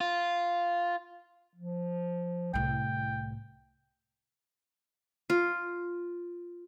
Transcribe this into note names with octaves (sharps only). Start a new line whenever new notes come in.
F4
F3
C2 A2 G5
F4